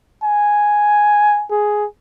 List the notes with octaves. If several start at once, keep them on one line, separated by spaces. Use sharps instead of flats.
G#5
G#4